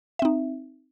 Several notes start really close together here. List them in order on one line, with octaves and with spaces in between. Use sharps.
E5 C4 D#4